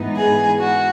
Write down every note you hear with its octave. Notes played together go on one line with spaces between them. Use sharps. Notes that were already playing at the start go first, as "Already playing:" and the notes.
Already playing: G#2 E3 B3 D#4
G#4
F#4